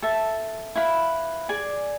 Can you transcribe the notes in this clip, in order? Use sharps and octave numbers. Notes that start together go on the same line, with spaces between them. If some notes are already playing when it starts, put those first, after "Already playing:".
A4 E5 A5
E4 B4 F5 B5
G#4 D5 G#5